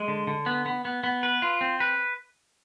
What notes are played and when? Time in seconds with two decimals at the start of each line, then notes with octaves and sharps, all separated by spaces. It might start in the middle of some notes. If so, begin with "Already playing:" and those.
Already playing: G#3
0.08 D3
0.27 D3
0.46 B3
0.66 B3
0.85 B3
1.04 B3
1.23 B4
1.42 F4
1.61 C4
1.80 B4